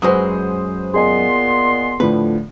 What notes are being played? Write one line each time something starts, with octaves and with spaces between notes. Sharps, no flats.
F#2 F#3 G#3 B4 C5 D#6
A#2 B3 G#4 D#5 G#5 C6
A2 D3 F3 B4